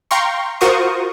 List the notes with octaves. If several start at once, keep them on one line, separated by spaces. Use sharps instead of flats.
F5 G5 A#5 C6 C#6
F4 F#4 A#4 C5 C#6 D#6